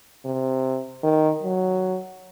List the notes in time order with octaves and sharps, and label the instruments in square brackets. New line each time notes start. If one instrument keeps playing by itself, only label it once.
[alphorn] C3
D#3
F#3